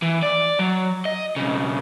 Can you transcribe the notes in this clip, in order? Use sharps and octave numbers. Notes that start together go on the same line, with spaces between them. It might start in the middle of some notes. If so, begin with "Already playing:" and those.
E3
D5
F#3
D#5
B1 C#3